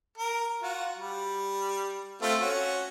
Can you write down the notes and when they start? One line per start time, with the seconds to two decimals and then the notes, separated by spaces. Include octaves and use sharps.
0.18 A#4
0.62 F4 F#4
0.98 G3
2.22 A3 C4 F4
2.41 C#4 F#4